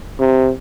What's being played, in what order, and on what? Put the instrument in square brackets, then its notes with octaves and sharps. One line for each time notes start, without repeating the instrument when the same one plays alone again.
[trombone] C3